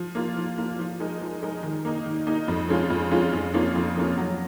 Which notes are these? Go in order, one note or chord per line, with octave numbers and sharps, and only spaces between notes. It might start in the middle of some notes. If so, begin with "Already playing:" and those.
Already playing: F3
A#3 F4
F3
A#3 F4
F3
G#3 D#4 A#4
F3
G#3 D#4 A#4
D#3
A#3 D#4
D#3
A#3 D#4
F2
F3 G#3 C#4 F4
F2
F3 G#3 C#4 F4
F2
F3 A#3 C#4 F4
F2
F3 A#3 C#4 F4
F#3